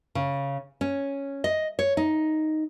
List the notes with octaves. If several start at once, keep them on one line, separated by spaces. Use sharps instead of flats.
C#3
C#4
D#5
C#5
D#4